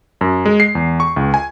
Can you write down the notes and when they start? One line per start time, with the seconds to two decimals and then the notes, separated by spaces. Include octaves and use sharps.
0.21 F#2
0.45 G#3
0.60 C7
0.75 E2
1.00 C#6
1.16 C#2
1.34 G#5